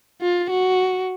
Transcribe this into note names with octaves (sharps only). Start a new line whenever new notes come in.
F4
F#4